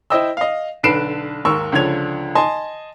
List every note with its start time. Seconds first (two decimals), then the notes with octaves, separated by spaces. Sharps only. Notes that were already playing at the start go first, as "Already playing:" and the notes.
0.10 E4 C5 D#5 G5 E6
0.37 D#5 F5
0.83 B1 D3 B4 C7 D7 E7
1.45 D#2 G#2 A#4 C#6 E6
1.72 C#2 D3 F3 C#5 G#6 F7
2.35 D#5 G#5 A5 C6